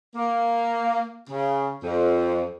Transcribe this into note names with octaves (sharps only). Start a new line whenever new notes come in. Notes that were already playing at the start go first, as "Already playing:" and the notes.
A#3
C#3
F2